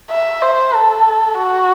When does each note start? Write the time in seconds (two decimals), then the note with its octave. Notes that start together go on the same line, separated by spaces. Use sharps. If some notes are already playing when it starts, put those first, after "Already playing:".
0.11 E5
0.42 C5
0.75 A4
1.38 F#4